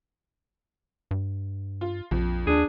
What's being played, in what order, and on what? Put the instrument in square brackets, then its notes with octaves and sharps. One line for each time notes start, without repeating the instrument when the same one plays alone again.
[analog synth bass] G2
[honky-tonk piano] F4
[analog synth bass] A#1 [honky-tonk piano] F2 F3
[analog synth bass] D#2 [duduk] D4 [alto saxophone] G#4